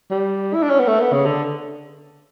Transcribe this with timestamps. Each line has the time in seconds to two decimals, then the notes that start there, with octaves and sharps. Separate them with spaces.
0.11 G3
0.54 E4
0.63 D4
0.71 C#4
0.79 B3
0.87 A3
1.00 B3
1.13 C#3
1.26 D3